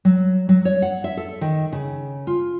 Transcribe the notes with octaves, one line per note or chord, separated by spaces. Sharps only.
F#3
F#3
C#5
F#5
E5
A4
D#3
C#3
F4